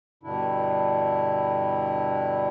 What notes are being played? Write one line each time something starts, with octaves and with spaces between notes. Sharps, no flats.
G2 B2 D3 D4 E4